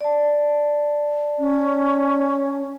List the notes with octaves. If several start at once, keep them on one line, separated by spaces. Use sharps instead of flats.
D5 A5
C#4